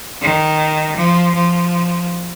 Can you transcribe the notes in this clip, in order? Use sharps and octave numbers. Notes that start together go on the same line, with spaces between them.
D#3
F3
F3